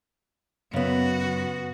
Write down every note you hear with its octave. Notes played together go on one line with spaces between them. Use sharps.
F#2 C#3 B3 F#4